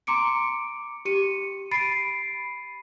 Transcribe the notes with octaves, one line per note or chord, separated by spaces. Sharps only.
A#5 C6 D6 C#7 D7
G4 C#7 D#7
B5 A6 C7 D7 D#7